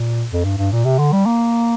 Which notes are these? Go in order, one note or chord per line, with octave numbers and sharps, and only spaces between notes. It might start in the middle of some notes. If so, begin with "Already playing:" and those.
Already playing: A#2
F2
G2
G2
A#2
C3
D3
G3
A#3